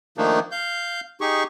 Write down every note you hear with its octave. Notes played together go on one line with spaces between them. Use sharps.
D#3 F3 A3 A#3 D4 D#4
F5 G6
D#4 G4 G#4 C#6